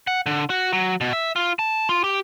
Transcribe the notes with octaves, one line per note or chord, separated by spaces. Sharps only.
F#5
D3
F#4
F#3
B2
E5
F4
A5
F4
G4